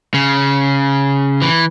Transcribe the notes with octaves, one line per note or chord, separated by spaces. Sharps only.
C#3
E3